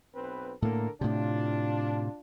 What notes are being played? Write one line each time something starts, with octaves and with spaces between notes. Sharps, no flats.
B1 C4 B4
A2 D3 A#3 A4 A#4
A2 C3 D4 F4